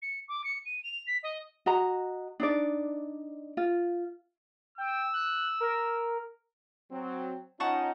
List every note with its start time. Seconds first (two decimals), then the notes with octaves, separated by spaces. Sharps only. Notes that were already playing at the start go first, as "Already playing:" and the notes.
0.02 C#7
0.28 D6
0.44 C#7
0.65 D#7
0.84 F7
1.07 B6
1.23 D#5
1.66 F#4 D#5 A#5
2.40 D4 D#4 D5
3.57 F4
4.78 G5 E6
5.13 F#6
5.60 A#4
6.91 F#3 C4
7.60 C#4 D#4 F4 F#5 A5 C#6